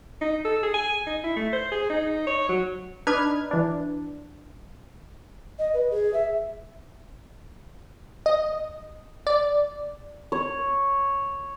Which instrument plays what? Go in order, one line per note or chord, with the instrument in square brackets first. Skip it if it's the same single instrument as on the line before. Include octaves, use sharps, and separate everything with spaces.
[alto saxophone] D#4
A4
G#4
G#5
D#4
E4
A3
C5
G#4
D#4
C#5
F#3
[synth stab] D4 D#4 B4 F6 G#6
E3 D4
[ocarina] D#5
B4
G#4
E5
[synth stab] D#5
D5
[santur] C#5